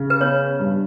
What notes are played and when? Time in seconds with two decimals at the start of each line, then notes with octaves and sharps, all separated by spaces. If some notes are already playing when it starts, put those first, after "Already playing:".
Already playing: C#3
0.10 B4
0.21 B3 C#5
0.59 G2